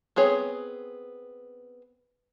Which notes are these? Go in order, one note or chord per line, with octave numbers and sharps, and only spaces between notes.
B3 C4 G#4 C#5